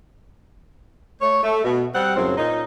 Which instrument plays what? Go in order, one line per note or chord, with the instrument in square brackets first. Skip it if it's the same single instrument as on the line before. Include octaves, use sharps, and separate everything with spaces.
[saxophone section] A3 C#5
A3
B2
G3 C4 F#5
F#2 A2 C#3 C4
A#2 C#4 D#4